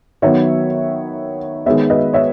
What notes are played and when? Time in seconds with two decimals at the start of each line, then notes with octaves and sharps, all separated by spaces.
0.22 D#3 F#3 B3 C#5 E5
1.66 D#3 G#3 B3 C#5 E5
1.90 B4 D#5
2.13 C#5 E5